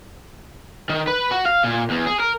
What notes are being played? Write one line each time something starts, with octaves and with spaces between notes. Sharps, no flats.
D#3
B4
F#4
F5
A#2
E2
G#4
A#4